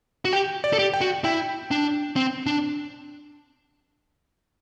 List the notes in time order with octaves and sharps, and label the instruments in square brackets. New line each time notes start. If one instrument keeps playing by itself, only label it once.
[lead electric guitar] F#4
[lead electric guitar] G4 [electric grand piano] G5
[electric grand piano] D5
[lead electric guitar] A4
G4
[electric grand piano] G5
[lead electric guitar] F#4
[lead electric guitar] E4 [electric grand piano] G5
[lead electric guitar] D4
C4
D4